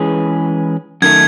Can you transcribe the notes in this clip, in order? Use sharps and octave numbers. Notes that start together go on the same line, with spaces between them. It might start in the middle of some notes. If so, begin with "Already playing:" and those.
Already playing: E3 G#3 C#4 G#4 B4
F#2 D#3 A3 G#6